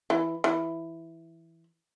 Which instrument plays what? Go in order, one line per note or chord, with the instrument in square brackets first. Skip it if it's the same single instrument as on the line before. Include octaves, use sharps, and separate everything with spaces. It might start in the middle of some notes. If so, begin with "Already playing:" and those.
[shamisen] E3
E3